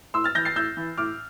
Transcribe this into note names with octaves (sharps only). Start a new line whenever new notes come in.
A2 C6 E6
F6 A6
E3 G6 A#6
A6 C7
A2 E6 G6
E3
A2 D6 F6